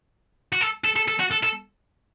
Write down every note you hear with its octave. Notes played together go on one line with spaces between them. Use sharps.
F#4
A4
A4
A4
A4
F#4
A4
A4